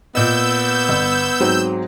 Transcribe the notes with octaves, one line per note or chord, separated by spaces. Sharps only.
A#2 B3 D#5 E6 G6
G1
G#2 F#3 C4